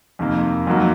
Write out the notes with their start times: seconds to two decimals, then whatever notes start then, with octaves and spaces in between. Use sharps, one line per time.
0.19 F2 C3 D#3 A#3
0.67 F2 D#3 F#3 A#3